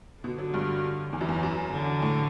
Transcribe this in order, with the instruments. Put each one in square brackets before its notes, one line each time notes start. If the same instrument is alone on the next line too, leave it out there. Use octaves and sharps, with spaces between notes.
[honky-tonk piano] B2 [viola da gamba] D3
[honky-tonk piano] F#3
G2
[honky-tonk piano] E2 [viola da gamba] E3
[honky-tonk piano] F#2
E2
F#2
[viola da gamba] D3
[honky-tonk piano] A2